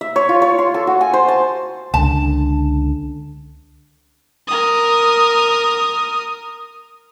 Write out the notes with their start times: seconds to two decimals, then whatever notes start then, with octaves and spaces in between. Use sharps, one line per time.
0.01 E5
0.16 C#5
0.29 F4
0.42 C#5
0.59 C6
0.74 A4
0.87 F#4
1.01 G#5
1.13 C5
1.28 A5
1.94 C#2 D3 A5
4.48 A#4 D#6